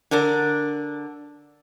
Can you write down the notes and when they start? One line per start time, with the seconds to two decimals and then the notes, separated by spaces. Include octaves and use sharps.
0.11 D3 D4 A#4 D5